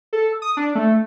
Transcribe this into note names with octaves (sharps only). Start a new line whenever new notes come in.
A4
D#6
D4
A3